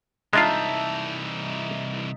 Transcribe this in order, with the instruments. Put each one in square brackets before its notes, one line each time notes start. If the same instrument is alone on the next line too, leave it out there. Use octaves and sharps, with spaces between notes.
[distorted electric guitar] C2 E3 [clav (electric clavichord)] G#3 D4 F4 [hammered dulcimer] D#4 E5 A5